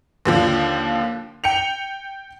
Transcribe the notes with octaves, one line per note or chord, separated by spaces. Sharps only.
D#2 D3 F3
G5 C#7 F7